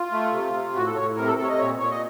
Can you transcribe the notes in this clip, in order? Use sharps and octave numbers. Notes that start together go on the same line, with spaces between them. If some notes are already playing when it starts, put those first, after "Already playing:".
Already playing: F4
A3
C3
C3
A2 F#4
A4
A2 C#5
C3 A#4
A4
C3 A4
C#5
D#5
A#2 C#5
A#2 C#5
D#5